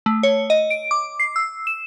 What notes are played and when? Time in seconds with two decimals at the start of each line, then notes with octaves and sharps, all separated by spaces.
0.06 A3
0.23 C#5
0.50 D#5
0.70 D7
0.91 D6
1.20 C7
1.36 E6
1.67 E7